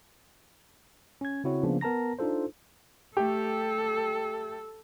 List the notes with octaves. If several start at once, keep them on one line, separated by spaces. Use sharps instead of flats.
C#4 G#6
C#3 C4 E4 F#4 C#5
C#3 F3 A#3 B3 D4
B3 A#4 A5 A#5 A#6
D4 D#4 F4 A4 C5
A3 G4 A4